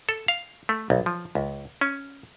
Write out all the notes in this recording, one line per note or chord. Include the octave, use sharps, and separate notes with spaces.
A4
F5
A3
B1
F3
C#2
C#4